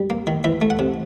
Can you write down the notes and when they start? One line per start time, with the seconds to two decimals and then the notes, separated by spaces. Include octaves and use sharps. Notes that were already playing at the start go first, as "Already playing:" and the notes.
Already playing: G3
0.10 A#3
0.27 D#3
0.44 E3 E5
0.61 A3
0.70 F#5
0.79 C3